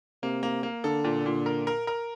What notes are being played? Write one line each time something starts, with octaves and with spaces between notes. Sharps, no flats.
C3 A#3
A#3
A#3
D3 A4
A#2
A#2
A#4
A#4
A#4